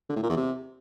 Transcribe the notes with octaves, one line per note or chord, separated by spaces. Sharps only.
D3
A2
A#2
E2
C3